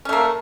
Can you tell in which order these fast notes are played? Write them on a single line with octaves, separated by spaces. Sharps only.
C#4 A3 A#3